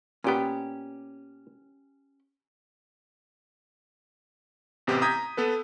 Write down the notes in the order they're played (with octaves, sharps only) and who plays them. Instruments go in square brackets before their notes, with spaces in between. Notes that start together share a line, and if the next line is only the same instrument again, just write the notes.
[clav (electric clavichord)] A#2 B3 [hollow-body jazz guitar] C#4 G4
[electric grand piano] A1 C3 B3 G4
A#5 D#6 G6 G#6 B6
B3 A4 B4